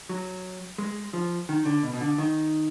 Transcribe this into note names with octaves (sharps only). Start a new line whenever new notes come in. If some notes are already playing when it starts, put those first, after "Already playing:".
F#3
G#3
F3
D#3
D3
B2
B2
D3
D#3